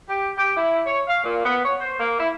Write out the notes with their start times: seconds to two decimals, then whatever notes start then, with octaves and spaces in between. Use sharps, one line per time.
0.09 G4
0.37 G4
0.56 E4
0.86 C#5
1.08 F5
1.24 A#2
1.45 B3
1.65 C#5
1.80 C5
2.00 A#3
2.19 E4